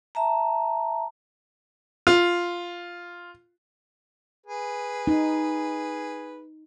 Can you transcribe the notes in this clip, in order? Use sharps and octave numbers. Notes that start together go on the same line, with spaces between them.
E5 A5 A#5
F4
G#4 B4
D#4